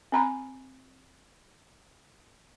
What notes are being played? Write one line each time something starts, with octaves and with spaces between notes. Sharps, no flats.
C4 A#5 B5